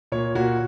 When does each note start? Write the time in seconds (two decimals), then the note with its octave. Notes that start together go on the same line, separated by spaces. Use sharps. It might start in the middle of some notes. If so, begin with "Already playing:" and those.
0.12 A#2 C#5
0.35 A#2 F#4